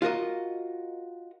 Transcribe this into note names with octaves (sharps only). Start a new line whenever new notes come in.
F4 F#4 A#4 D#5